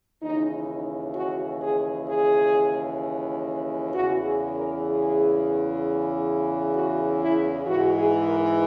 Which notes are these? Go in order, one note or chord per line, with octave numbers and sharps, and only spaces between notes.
D#2 C#3 E3 D#4
D#4
F#4
G#4
G#4
E2 C#3 E3 F#4
G#4
A#4
G#4
F#4
E4
G#2 E3 F#4
G#4
A#4